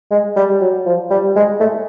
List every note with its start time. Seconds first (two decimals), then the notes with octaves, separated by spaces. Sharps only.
0.11 G#3
0.36 G3
0.61 F#3
0.86 F3
1.10 G3
1.36 G#3
1.60 A3